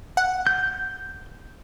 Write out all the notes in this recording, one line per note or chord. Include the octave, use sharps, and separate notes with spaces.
F#5
G6